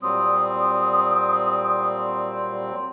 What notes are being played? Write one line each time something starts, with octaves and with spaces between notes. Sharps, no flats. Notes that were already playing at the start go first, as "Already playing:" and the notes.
A#2 F#3 G3 C4 D#6